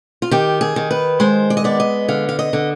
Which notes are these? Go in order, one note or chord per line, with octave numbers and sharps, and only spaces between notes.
F4
D#3 G4
G#4
D#3
B4
G#3 C5
D5
D#5
B3 D5
D#5
D3 F5
F5
D#5
D3